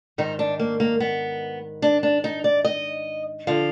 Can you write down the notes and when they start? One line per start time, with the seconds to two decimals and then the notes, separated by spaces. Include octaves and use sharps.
0.18 G#2 D#3 D#4
0.39 D4
0.60 A#3
0.80 A#3
1.00 B3
1.82 D4
2.03 D4
2.24 D#4
2.44 D5
2.65 D#5
3.47 D3 F3 F5